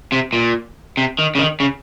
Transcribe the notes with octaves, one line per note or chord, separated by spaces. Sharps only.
C3
A#2
C3
D#3
C#3
D#3
C#3